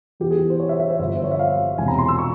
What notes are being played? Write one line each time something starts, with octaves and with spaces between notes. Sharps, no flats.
E2 E3 G4
G#4
C5
C#5
E5
E5
C5
G1 G2 F3 E5
C5
C#5
E5
F5
E1 E2 C3 G#5
A#5
C6
E6
C#6